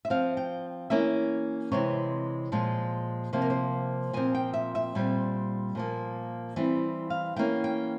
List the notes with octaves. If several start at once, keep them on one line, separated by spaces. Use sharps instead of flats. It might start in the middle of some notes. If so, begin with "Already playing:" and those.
E5
F3 C4 F5
G5
E3 A#3 C#4 E5
C3 E3 G#3 C4 C#5
A#2 F3 G#3
C3 F3 A#3 C5
A#4
C5
A#2 F3 C4 G#5
G5
E5
E5
A#2 G3 C4
A#2 F3 A#3
E3 G3 C4
F5
E3 A#3 C#4 G5
G5